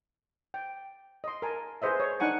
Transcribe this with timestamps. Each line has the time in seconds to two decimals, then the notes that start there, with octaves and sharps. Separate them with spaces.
0.54 G5
1.24 D#5 C6
1.42 A#4 G#5 A5
1.82 G#4 B4 C5 D#5 E5
2.00 C#5
2.20 D4 D#4 F#5 G#5 C#6